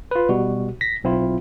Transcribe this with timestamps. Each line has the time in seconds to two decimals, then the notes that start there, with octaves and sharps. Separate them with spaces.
0.11 F4 B4
0.29 B2 G3 F#4
0.81 A#6 B6
1.04 B1 C4 E4 F4